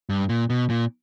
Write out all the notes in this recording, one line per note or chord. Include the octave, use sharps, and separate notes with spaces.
G2
A#2
B2
A#2